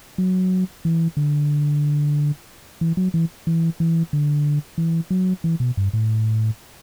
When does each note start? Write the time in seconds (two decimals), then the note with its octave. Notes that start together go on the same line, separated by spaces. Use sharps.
0.18 F#3
0.85 E3
1.17 D3
2.81 E3
2.97 F#3
3.14 E3
3.47 E3
3.80 E3
4.13 D3
4.78 E3
5.10 F#3
5.44 E3
5.60 B2
5.77 G2
5.93 A2